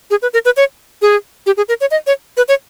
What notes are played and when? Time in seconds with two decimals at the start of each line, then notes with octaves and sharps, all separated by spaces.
0.11 G#4
0.22 B4
0.33 A#4
0.45 B4
0.57 C#5
1.02 G#4
1.46 G4
1.57 G#4
1.69 A#4
1.81 C#5
1.91 D#5
2.07 C#5
2.37 B4
2.48 C#5